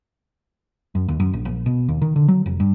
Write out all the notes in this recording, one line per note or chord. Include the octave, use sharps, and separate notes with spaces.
F#2
D#2
F#2
A#1
A#1
B2
D#2
D#3
D3
F#3
F1
G2